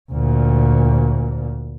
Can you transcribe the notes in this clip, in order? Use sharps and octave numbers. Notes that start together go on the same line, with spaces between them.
D2 A#2